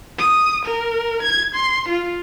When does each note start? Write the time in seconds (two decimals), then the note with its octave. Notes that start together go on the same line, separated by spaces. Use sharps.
0.18 D#6
0.66 A#4
1.23 G#6
1.55 C6
1.89 F4